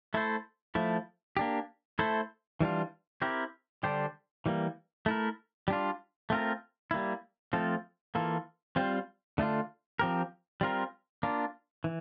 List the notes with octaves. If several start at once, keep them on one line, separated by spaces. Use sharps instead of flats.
A3 E4 A4 C5
F3 A3 E4
A#3 D4 G4
A3 E4 A4 C5
E3 G3 D4 F4
C4 E4 G4 A#4
D3 G3 D4 G4 C5
E3 G3 A#3
A3 E4 A#4
G3 D4 F4
A3 C4 F4 A#4
G3 A#3 E4
F3 A3 C4 F4 A4
E3 A#3 F4 A4
G3 C4 F4 C5
D3 A3 D4 F4
F3 C4 G4 A#4
G3 C4 F4 A#4
A#3 D4 F4
E3